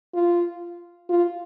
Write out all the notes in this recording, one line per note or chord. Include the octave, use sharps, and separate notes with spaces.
F4
F4